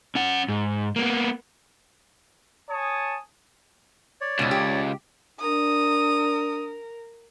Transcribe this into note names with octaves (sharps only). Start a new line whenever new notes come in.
C#4 F#5
G#2
A#3 B3
C#5 G#5 A5 D#6
C#5 D5
C#2 G#2 B2
G4
D4 A#4 D#6